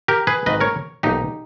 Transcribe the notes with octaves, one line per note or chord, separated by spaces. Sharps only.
G4 A#4
G#4 B4
G#1 G#2 D#3 B4 D#5
A#4 C#5
B1 A#2 D#4 G4